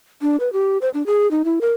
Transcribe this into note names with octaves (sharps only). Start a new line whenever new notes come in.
D4
B4
G4
C5
D4
G#4
D#4
E4
A#4